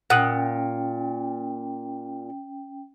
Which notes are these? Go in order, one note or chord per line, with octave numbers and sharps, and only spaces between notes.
A#2 C#4 F#5 G5 D#6 F#6